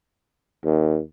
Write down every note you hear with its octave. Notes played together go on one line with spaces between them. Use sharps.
D#2